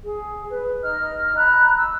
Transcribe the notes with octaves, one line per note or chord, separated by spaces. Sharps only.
G#4
B4
D#4 D#5 F6
A#5 B5 F#6
E6